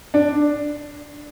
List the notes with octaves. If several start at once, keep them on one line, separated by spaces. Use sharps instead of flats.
D4